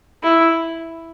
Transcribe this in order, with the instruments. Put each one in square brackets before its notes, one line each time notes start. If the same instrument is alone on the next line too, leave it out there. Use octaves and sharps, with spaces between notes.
[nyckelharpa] E4